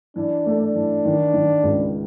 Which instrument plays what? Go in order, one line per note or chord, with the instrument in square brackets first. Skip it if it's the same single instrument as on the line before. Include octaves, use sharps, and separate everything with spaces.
[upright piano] E3 [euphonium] D4
[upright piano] A3
[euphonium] D4
[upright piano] E3
D#3
D#3
C#2